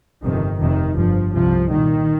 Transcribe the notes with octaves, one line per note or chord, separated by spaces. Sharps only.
G1 F2 C3 D#3
F1 F2 C3 D#3
G1 G2 F3
C2 C3 F3
C2 A#2 D#3